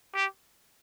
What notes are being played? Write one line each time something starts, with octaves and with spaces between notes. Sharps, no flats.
G4